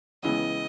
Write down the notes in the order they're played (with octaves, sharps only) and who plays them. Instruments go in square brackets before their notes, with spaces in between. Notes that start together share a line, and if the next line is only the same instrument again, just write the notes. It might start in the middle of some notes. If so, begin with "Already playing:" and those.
[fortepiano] C#2 C#3 E3 B3 [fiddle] D#5